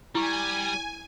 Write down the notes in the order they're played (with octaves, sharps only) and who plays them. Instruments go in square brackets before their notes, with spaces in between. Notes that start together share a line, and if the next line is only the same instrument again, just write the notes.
[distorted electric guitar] G3 [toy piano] E4 C#6 [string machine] G#5